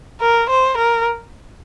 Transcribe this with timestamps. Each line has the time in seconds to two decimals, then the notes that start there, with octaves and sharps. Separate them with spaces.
0.21 A#4
0.50 C5
0.78 A#4